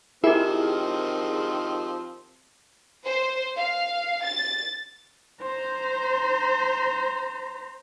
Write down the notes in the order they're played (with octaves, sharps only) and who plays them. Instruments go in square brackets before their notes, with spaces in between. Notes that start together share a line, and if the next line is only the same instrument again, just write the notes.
[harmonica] D#3 F3 C4 [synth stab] E4 [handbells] G4 A#4 [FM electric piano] G#4
[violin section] C5
F5
A6
[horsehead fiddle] C5 A#5